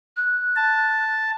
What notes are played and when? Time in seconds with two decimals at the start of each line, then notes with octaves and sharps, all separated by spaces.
0.17 F#6
0.56 A5